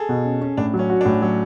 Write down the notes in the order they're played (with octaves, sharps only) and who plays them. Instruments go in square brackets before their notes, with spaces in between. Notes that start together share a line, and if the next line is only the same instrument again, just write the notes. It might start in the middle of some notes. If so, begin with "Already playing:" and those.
Already playing: [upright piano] G#4 A4
[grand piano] B2
C#4
C#4
[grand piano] A2 [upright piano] D4
[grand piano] F#3
[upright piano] C#4
[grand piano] F#4
[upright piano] D4
[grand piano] A2 [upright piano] C#4
[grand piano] F#3 [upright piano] C#4